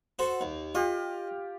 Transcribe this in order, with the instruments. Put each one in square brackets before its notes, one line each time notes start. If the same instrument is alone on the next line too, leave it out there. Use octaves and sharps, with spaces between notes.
[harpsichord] F#4 A4 C5
D#2
[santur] F4 G4 [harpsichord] D#5